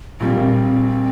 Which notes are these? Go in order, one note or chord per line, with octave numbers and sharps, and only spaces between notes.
A#1 A#2 G3 A#3 C4